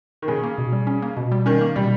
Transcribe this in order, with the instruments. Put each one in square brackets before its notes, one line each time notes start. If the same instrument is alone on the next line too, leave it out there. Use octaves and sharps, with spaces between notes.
[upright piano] D#3
[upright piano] C#3 [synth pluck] C#4
[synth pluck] A#3
B2
G3
C#4
A#3
B2
G3
[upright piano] D#3 [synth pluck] C#4
[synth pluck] A#3
[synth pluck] B2 [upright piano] G3